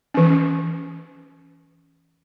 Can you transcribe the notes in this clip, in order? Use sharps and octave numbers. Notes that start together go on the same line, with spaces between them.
E3 C#4